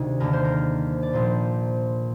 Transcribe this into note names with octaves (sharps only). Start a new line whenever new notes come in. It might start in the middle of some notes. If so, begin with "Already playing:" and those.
Already playing: D2 C3 D#3 G#4
D#2 D3 A#4
C5
A#4
D5
A#1 A#2 C5